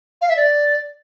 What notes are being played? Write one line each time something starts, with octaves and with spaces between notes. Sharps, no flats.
F5
E5
D5